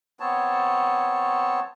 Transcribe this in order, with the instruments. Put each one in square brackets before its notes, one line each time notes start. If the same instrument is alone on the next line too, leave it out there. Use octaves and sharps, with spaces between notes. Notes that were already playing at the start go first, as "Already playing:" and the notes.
[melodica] B3 C4 C#5 A5